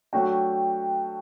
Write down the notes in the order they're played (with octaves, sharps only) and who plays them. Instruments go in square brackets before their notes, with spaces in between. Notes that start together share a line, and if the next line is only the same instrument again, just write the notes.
[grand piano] F#3 A3 D4 F#4 [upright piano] G5